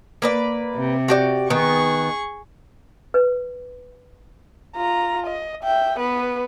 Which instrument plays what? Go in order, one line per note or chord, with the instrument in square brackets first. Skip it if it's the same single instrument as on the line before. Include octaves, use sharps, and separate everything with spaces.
[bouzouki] A#3 B4 D5
[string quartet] C3
[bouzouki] F#4 G4 D5
[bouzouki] D#3 B3 [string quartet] G#4 C#6
[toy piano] B4
[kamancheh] F4 A#5
D#5
E5 G5
B3 B4